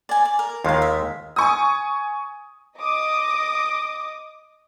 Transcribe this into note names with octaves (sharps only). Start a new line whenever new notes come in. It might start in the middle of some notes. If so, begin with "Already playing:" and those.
D5 G#5
D5
A#4
D#2 D#3 G#3 F4 F5
E5
G#5 C#6 D#6
D#5 D6 D#6